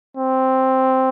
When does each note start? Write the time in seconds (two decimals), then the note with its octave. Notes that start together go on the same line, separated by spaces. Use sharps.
0.17 C4